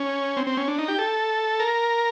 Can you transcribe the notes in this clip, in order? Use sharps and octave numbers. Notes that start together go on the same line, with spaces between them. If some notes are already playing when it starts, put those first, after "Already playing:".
Already playing: C#4
C4
C4
C#4
D4
D#4
G4
A4
A#4